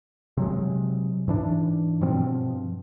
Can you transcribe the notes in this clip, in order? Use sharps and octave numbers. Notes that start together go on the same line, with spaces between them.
C3 F#3 G#3
G#2 E3 D4
G2 B2 F3 C4